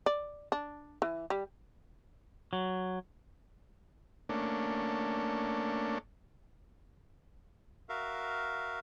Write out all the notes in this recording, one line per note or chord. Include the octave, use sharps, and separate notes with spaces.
D5
D4
E3
G3
F#3
A3 A#3 C#4 D4 A4
F#4 A#4 E5 F5